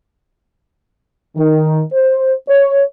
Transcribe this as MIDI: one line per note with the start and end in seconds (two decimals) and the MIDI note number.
1.37 1.81 51
1.92 2.31 72
2.48 2.81 73